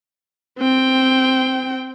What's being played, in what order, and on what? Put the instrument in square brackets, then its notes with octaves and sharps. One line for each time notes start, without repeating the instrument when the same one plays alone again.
[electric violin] C4 G5